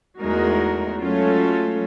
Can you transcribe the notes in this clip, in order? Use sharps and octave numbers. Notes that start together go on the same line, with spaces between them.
E2 G#3 A3 D#4 F#4 A#4
F#3 G#3 A3 C#4 F4 A4